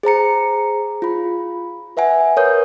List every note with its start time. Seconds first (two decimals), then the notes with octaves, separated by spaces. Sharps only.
0.03 G#4 C5 A#5 C#7
1.02 F4 B5
1.97 B4 E5 F#5 G#5
2.37 A#4 B4 C#5 D#6 G6